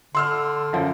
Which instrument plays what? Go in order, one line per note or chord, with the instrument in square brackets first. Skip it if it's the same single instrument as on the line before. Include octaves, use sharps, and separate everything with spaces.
[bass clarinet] D3 [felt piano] C6 E6 F6
[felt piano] F#2 F3